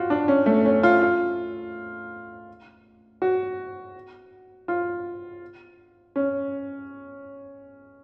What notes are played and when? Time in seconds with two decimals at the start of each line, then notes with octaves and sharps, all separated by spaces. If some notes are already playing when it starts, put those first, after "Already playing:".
Already playing: F4 F#4
0.10 D4
0.28 C#4
0.46 A3
0.65 C#4
0.83 F4
1.02 F4
3.22 F#4
4.68 F4
6.16 C#4